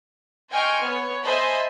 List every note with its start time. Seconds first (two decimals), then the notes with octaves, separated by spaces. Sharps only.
0.51 D#5 G5 G#5 C6 C#6 F6
0.83 B3 C#5
1.24 C5 D#5 E5 G#5 A5 B5